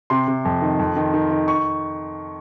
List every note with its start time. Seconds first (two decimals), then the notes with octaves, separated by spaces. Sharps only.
0.10 C3 C6
0.28 C3
0.45 F2
0.62 D#3
0.79 F2
0.97 D#3
1.14 D#3
1.31 D#3
1.48 C#6